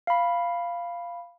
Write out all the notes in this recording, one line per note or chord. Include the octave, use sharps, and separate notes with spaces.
F5 B5